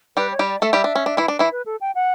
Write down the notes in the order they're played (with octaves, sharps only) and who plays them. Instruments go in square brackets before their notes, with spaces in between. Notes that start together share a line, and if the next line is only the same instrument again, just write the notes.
[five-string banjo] G3 G4 [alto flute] B4
[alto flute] C#5
[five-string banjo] G3 G4
[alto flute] D5
[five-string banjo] A3 A4 [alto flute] E5
[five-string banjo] G3 G4
D4
C#4
D4
E3 E4
D4
E3 E4
[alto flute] B4
A4
G5
F#5